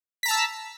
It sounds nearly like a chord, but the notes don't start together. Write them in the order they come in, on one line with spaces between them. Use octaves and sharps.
B6 A#5 A5 E6